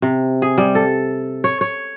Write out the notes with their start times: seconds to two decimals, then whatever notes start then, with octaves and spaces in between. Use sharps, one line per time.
0.02 C3
0.42 G#4
0.58 G3
0.75 A4
1.44 C#5
1.61 C#5